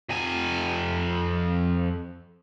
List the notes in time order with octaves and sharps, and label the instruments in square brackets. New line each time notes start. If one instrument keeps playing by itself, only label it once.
[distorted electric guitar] F2 G#5